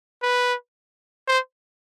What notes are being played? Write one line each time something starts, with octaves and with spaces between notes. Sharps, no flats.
B4
C5